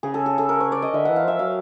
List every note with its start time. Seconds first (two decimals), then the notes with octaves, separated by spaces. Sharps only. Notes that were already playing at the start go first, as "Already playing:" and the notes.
0.03 C#3 G#4
0.14 A4
0.26 G#4
0.38 A4
0.49 A#4
0.60 C#5
0.72 D5
0.82 D#5
0.93 D3 E5
1.05 E3 F#5
1.16 F5
1.24 F3 E5
1.39 F#3 F5